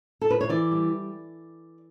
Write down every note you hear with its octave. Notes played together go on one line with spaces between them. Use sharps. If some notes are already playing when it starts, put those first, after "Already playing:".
A4
B4
C#5
E3 D5
G3